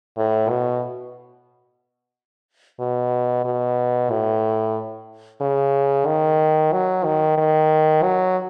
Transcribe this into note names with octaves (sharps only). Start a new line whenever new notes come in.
A2
B2
B2
B2
A2
C#3
D#3
F#3
D#3
D#3
F#3